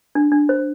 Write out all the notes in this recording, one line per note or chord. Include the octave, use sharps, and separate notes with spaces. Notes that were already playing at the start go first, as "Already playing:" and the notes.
D4
D4
C5